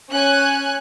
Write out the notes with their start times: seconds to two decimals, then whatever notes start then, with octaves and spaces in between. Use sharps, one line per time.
0.10 C#4 G#5 F#6